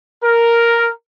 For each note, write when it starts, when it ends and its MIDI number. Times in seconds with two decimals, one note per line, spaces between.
0.23 0.90 70